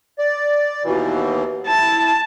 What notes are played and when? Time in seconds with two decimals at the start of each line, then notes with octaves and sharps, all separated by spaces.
0.19 D5
0.84 D#2 B2 E3
1.68 E4 A5